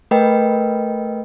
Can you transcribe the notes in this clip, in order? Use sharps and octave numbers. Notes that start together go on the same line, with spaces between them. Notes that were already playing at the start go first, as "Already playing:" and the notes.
A3 A#4 B4 D#5 G5